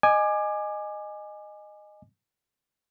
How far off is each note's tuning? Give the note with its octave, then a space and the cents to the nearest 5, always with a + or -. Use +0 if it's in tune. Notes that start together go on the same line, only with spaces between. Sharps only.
D#5 -15 G#5 +0 D6 +25